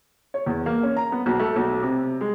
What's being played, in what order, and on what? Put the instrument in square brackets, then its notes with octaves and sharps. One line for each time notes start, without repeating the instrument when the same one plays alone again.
[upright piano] C#5
E2
A#3
C#4
A#5
B3
B1
A3
B1
C3
G#3